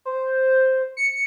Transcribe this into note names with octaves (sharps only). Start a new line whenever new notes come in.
C5
C#7